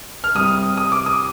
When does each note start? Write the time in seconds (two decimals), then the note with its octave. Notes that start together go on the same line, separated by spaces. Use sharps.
0.24 F6
0.35 C2 C3 G3 D#6
0.77 D#6
0.92 D6
1.06 D#6